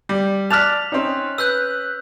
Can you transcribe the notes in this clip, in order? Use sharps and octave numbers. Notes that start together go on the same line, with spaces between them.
G3
D5 A5 F6 F#6 A6 B6 F7
C4 C#4 D#4
B4 E6 F#6 G6